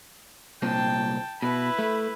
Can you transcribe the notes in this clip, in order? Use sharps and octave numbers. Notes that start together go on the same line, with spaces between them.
C2 A#2 C4 G5 A5
B2 E4 B4
A3